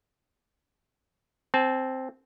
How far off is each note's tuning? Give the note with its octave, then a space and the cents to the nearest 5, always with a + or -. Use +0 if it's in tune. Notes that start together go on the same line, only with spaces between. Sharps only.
C4 +0 A5 -30